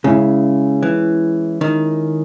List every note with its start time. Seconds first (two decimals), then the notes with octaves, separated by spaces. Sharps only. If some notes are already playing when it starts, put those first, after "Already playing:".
0.04 C#3 G#3 C#4 E4
0.83 E3
1.61 D#3